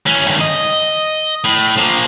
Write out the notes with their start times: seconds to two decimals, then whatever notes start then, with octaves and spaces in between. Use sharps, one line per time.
0.06 E3 C#4
0.26 G2 D#3
0.41 D#5
1.44 A2
1.77 F3 A#3